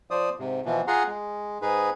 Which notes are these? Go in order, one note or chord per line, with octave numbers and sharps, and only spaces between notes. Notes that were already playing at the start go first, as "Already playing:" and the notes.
F3 C5 D5 D#6
G#2 C3
B2 E3 F3
F4 G#4 F#5 A#5 C6
G#3
G#2 D#4 G#4 B4